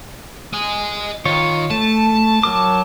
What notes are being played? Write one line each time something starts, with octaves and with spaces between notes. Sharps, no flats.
D#5 G#5
D#3 F4 C#5
A3 A5
F#3 A#4 D6